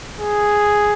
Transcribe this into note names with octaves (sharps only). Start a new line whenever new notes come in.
G#4